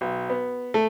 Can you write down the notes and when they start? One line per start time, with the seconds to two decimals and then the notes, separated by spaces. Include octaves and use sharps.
0.01 B1
0.30 B3
0.74 A3